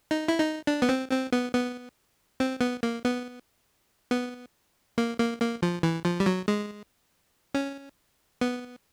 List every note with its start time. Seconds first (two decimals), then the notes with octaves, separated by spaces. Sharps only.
0.11 D#4
0.28 E4
0.40 D#4
0.67 D4
0.82 B3
0.89 C4
1.11 C4
1.32 B3
1.54 B3
2.40 C4
2.61 B3
2.83 A#3
3.05 B3
4.11 B3
4.98 A#3
5.19 A#3
5.41 A#3
5.62 F3
5.83 E3
6.05 F3
6.20 G3
6.26 F#3
6.48 G#3
7.54 C#4
8.41 B3